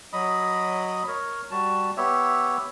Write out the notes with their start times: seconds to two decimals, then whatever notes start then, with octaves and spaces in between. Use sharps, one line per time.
0.13 F#3 D#5 B5 D#6
1.08 A#4 C#5
1.51 G3 F#4 A5
1.97 B3 G4 C#5 E5